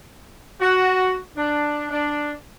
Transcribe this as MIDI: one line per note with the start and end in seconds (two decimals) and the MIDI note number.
0.60 1.16 66
1.37 1.86 62
1.91 2.31 62